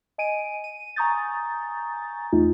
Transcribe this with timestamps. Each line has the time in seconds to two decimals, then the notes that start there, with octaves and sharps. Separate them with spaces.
0.18 D#5 G#5 D7 D#7
0.64 D#7
0.96 G#5 A#5 C#6 D#6 G6 A6
2.32 E2 A3 D#4 F4